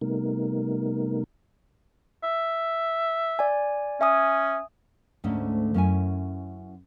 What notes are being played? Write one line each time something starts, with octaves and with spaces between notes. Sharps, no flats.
C3 G3 A3 B3 D#4 A#4
E5
D5 G#5
C#4 E5 G#5 D#6
D2 G#2 D3 A3 C#4
F#2 C#4 E4 G#5